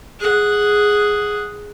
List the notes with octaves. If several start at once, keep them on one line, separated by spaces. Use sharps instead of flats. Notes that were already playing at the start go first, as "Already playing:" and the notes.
G#4 F#5